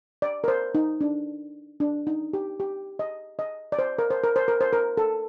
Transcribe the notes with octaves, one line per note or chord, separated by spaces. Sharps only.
D5
A#4
C5
D#4
D4
D4
D#4
G4
G4
D#5
D#5
D5
C5
A#4
C5
A#4
C5
A#4
C5
A#4
A4